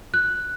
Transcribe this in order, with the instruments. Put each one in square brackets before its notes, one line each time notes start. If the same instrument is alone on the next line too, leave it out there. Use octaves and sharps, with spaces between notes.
[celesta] F#6